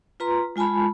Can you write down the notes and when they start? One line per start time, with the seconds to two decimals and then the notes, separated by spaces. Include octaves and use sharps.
0.20 F4 B4 A#5 C6
0.56 G#3 F4 G#5 A5 B5